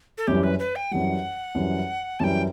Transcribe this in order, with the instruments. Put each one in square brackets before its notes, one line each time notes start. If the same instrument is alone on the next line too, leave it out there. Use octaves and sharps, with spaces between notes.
[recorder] A4
[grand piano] F#2 E3 G3 [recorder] G4
[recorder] B4
B4
G5
[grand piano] F#2 E3 G3 [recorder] F#5
[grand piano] F#2 E3 G3
[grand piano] F#2 E3 G3 [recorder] G5 A5